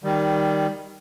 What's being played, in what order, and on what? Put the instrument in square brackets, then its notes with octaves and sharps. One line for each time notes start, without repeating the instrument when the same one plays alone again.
[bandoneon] D#3 G3